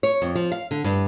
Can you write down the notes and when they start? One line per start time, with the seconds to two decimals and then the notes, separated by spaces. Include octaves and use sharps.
0.03 C#5
0.22 F2
0.35 F3
0.52 F5
0.71 D3
0.84 G2